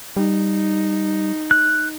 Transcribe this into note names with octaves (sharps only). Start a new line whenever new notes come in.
G3 D#4
F#6